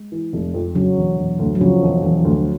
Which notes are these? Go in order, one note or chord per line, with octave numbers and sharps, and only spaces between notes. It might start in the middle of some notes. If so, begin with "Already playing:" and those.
Already playing: G#3
E3
F1
F2
C#3 F#3
E1
E1
D2
F#3
C#3 F3
E1
E1
D2